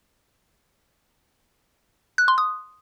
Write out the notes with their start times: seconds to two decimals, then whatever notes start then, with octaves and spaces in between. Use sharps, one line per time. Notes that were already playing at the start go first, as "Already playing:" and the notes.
2.18 F#6
2.28 C6
2.38 D#6